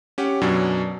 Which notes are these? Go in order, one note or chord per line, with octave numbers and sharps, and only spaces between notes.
C#4 G4 F#5
F#2 B2 F#3 C#4 D4